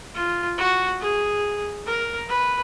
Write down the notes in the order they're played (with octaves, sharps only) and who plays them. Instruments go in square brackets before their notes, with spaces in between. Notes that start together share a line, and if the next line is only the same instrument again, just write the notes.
[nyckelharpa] F4
F#4
G#4
A#4
B4